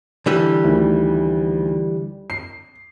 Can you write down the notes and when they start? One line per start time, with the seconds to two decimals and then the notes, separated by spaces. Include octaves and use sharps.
0.26 D3 E3 G3
0.64 D2 D#3
2.30 C7